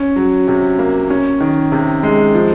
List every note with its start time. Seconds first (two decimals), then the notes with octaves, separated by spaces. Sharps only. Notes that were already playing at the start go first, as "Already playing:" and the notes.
Already playing: C#4
0.16 F#3
0.48 C3
0.79 A#3
1.10 C#4
1.40 D#3
1.72 C3
2.03 G#3
2.35 F3